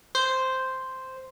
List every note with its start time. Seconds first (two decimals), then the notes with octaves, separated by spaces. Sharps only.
0.15 C5